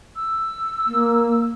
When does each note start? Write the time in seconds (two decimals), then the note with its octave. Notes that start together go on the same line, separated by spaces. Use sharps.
0.16 E6
0.87 A#3